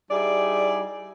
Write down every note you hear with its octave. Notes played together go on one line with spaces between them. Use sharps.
G3 D#4 E4 G#4 D5